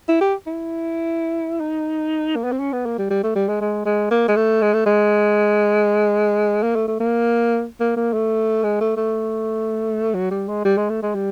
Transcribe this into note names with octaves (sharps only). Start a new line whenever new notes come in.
E4
G4
E4
D#4
A#3
B3
C4
C#4
B3
A#3
G3
G3
A3
G3
G#3
G#3
G#3
A#3
G#3
A3
G#3
A3
G#3
A#3
A3
A3
A#3
A#3
A#3
A3
G#3
A3
A3
F#3
G3
G#3
G3
G#3
A3
G#3
G3